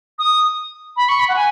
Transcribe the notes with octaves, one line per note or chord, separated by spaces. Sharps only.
D#6
B5
C#6
B5
F#5
G#5